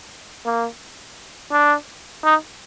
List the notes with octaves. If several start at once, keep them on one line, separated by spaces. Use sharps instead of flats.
A#3
D4
D#4